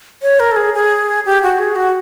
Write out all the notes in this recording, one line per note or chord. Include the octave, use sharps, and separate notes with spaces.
C#5
A#4
A4
G#4
G#4
G4
F#4
G#4
F#4